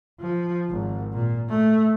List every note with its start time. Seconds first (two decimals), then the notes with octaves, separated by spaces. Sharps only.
0.21 F3
0.70 G#1
1.13 A#2
1.49 A3